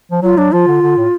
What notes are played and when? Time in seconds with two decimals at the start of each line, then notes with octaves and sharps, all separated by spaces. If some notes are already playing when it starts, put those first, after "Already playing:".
0.11 F3
0.22 F#3 F4
0.37 F#3 D4
0.52 F3 F4
0.67 D3
0.82 D3
0.98 A2